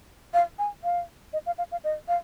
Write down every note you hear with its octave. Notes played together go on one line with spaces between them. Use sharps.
F5
G#5
F5
D#5
F5
F5
F5
D#5
F5